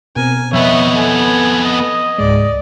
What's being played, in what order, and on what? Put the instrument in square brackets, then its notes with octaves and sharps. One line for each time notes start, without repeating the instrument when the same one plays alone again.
[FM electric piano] B2 C4 [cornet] A#4 [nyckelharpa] G#5
[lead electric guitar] F2 B3 [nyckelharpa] C#5 D#5 [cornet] E5
[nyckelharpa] A4 [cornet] G#5
[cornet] D#5
[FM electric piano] C#2 G#2 G#3 [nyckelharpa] D5